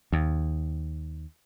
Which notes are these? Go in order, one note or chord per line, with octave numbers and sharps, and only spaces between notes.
D#2